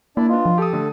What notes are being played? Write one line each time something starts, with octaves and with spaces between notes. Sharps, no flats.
A#3 D4 E4 D5
D4 F4 B4 D#5
F3
G4 A4 D#6
D3 A3